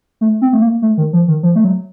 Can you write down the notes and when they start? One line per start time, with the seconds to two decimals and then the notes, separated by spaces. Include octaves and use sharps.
0.21 A3
0.42 C4
0.53 A3
0.62 A#3
0.82 A3
0.98 D#3
1.13 F3
1.28 D#3
1.43 F3
1.56 A3
1.64 F#3